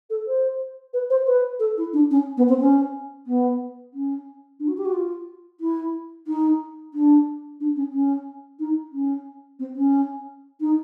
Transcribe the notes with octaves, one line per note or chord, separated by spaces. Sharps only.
A4
C5
B4
C5
B4
A4
E4
D4
C#4
B3
C4
C#4
B3
C#4
D4
F#4
G4
F#4
F4
E4
D#4
D4
D4
C#4
C#4
D#4
C#4
C4
C#4
D#4